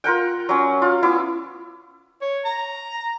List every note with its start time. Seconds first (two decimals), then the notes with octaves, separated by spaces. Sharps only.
0.04 F4 A#4 F#5 G5
0.49 F#3 C#4
0.82 F4
1.03 B3 E4 D6
2.22 C#5
2.45 A#5